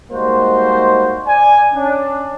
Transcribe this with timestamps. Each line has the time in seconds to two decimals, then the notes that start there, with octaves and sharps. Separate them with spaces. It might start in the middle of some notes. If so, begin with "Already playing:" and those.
0.11 G3 G#3 A#3 D#4 F#4 C5
1.27 D5 G#5
1.73 C#4 D4